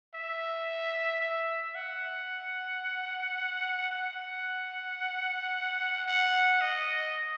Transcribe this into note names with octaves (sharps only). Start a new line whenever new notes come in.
E5
E5
F#5
F#5
F#5
D#5